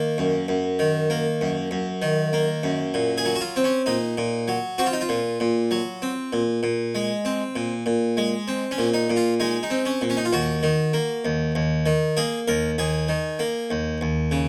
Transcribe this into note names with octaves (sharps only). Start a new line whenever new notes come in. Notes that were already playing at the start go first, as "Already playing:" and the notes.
Already playing: D#3 A#3
F#2
F#2
D#3
A#3
F#2
F#2
D#3
A#3
F#2
A#2
G#4
F#3
F#4
F4
C4
C#4
A#2 D#4
A#2
F#3
C4 F#4
F4
D#4
F4
A#2
A#2
F#3
C4
A#2
A#2
G#3
C4
A#2
A#2
G#3
C4
C#4
A#2
D#4
A#2
F4
G#3 D#4
D#4
C4
C#4
A#2
C#4
D#4
F4
D#2 F#4
D#3
A#3
D#2
D#2
D#3
A#3 G#4
D#2 A#4
D#2 G#4
D#3
A#3
D#2
D#2
C#3